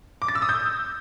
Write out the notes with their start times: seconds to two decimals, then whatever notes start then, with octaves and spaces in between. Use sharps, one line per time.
0.22 D6
0.28 A6
0.35 E6
0.42 D#6
0.49 G6